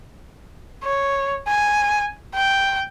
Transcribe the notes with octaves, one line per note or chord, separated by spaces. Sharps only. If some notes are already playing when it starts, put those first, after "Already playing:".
C#5
G#5
G5